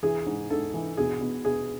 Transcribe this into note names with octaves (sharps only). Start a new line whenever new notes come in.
E3 G#4
G#2
G#2 A4
E3
B2 G#4
B2
B2 G#4